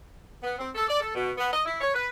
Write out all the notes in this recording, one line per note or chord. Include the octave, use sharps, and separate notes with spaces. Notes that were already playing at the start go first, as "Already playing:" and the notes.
B3
C4
A4
D5
A4
B2
B3
D#5
E4
C#5
B4